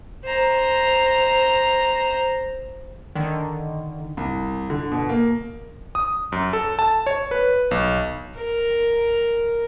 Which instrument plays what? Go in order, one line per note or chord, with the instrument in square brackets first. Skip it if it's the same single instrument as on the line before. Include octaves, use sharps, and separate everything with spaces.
[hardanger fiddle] C5 A#5
[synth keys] D3 D#3
[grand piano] C2
D3
B2
A#3
[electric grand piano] D#6
F#2
A4
A5
C#5
B4
B1
[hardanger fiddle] A#4